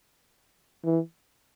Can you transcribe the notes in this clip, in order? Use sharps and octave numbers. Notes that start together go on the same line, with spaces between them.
E3